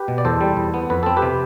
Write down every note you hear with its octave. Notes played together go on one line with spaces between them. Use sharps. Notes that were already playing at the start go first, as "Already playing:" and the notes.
Already playing: G4 B4
B2
D5
E2 A4 C5
G3
E2
B3
F2 B4
C4 A4
G4 B4
C3